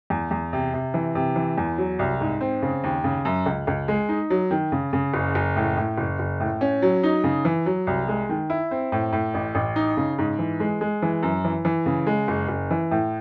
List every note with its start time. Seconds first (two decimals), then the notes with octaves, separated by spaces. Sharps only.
0.10 E2
0.31 E2
0.53 C3
0.74 C3
0.94 E3
1.15 C3
1.36 E3
1.58 E2
1.78 F#3
1.99 C2
2.21 G#2
2.41 C4
2.63 C#3
2.84 D#2
3.04 C#3
3.25 F#2
3.46 C#2
3.67 C#2
3.88 G#3
4.09 D#4
4.30 F#3
4.51 D#3
4.72 C#3
4.93 C#3
5.14 F#1
5.35 F#1
5.56 A2
5.77 A2
5.98 F#1
6.19 F#1
6.40 A2
6.61 C#4
6.82 F#3
7.03 D#4
7.24 C#3
7.45 E3
7.66 F#3
7.87 C2
8.08 G#3
8.29 D#3
8.50 E4
8.71 C4
8.92 A2
9.12 A2
9.34 A1
9.55 A1
9.76 D#4
9.97 C#3
10.18 G#2
10.39 E3
10.60 G#3
10.81 G#3
11.02 E3
11.23 F#2
11.45 E3
11.65 E3
11.86 C#3
12.07 G#3
12.28 F#1
12.49 F#1
12.71 E3
12.91 A2